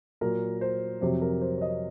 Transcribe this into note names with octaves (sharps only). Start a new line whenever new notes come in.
A#2 F#3 A#4
C5
F2 C3 F#3 C5
A#4
C5
C#5
D#5